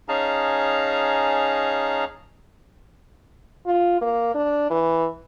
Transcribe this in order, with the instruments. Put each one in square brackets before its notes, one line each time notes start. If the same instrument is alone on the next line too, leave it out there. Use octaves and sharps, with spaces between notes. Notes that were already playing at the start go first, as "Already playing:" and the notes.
[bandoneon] C#4 D#4 G#4 F5 A5 A#5
[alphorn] F4
A#3
D4
E3